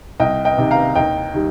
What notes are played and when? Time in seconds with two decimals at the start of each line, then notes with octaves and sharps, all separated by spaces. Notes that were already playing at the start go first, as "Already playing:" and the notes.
0.20 C2 D#5 G5
0.45 D#5 G5
0.58 C3 D#3
0.71 F5 A#5
0.95 D#2 D#5 G5
1.34 D#3 G3